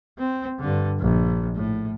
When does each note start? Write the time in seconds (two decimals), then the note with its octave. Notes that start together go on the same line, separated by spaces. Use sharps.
0.18 C4
0.60 G2 D3
1.00 A#1
1.55 A2